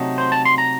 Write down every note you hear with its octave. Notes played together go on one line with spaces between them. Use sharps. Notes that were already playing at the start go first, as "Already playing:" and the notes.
Already playing: C3 F#3 A3 D#4
C5
A5
C6
A#5